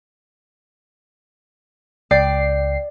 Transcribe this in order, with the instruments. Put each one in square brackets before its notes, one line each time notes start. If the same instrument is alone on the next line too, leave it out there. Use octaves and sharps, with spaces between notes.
[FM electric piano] C#2 G5 C7 [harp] D5